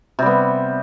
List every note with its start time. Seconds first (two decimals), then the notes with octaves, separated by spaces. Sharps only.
0.19 C3
0.22 G3
0.26 B3